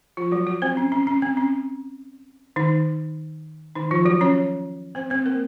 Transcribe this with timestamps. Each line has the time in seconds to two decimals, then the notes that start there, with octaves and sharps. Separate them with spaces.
0.17 F3 F4
0.32 F#3 F#4
0.47 F#3 F#4
0.62 C4 C5
0.77 C#4
0.92 C#4
1.07 C#4
1.22 C4
1.37 C#4
2.56 D#3 D#4
3.75 D#3 D#4
3.91 F3 F4
4.05 F#3 F#4
4.21 C#4 C#5
4.95 C4 C5
5.10 C4 C5
5.26 A#3 A#4